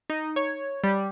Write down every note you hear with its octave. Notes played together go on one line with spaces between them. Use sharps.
D#4
C#5
G3